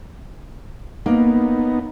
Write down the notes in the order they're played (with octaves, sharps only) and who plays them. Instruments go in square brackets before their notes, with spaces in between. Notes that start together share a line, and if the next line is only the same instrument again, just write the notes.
[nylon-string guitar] A#3 [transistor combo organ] B3 D#4